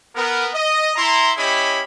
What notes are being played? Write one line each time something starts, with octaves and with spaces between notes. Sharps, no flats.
B3 A#4
D#5
E4 A#5 C6
C#4 E4 G4 C#5 D#5 B5